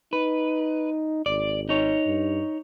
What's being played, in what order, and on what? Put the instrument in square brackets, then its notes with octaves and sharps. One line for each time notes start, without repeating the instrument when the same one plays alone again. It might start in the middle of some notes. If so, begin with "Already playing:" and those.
[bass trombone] D#4 [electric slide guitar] B4
[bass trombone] G#1 [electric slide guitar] D5
[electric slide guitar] D#4 C#5
[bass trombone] G2